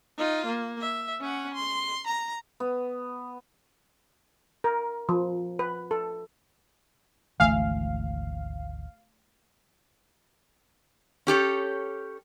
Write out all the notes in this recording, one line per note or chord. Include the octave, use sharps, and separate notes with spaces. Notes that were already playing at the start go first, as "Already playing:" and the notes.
D#4 F4
A#3
E5
C#4 F#5
C6
A#5
B3
A#4
F3
B4
A4
G#1 D2 E3 A3 F5 G#5
C#4 G4 A4 C#5